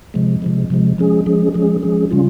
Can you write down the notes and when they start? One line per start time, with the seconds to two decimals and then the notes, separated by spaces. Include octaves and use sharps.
0.14 C3 F3 G#3
0.42 C3 F3 G#3
0.70 C3 F3 G#3
0.98 F3 G#3 C#4 G#4
1.26 F3 G#3 C#4 G#4
1.54 F3 G#3 C#4 G#4
1.83 F3 G#3 C#4 G#4
2.11 C#3 G3 C#4 F4